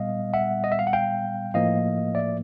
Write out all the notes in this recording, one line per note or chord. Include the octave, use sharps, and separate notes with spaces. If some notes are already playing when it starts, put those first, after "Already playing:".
Already playing: A#2 G3 B3 D#5 F5
E5 F#5
D#5
E5
F5
F#5
F5 G5
A2 F3 A#3 D#5 F5
D5 E5